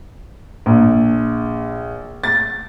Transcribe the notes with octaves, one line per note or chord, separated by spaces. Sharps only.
A#1
A6